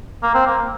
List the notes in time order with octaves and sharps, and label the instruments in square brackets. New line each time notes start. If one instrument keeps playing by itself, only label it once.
[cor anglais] A#3
C4
A#3